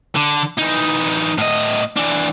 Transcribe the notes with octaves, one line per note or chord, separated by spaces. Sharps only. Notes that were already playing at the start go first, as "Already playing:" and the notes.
D3
E3 D#4
A2 D#5
E3 D4